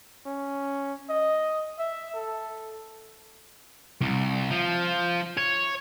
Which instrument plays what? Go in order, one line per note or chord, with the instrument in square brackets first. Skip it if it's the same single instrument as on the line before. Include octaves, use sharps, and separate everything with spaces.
[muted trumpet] C#4
D#5
E5
A4
[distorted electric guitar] C2
F3
C#5